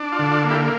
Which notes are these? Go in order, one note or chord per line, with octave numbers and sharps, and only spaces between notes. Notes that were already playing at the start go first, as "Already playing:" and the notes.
Already playing: D4
F4
D3
F4
A#3
E4 G4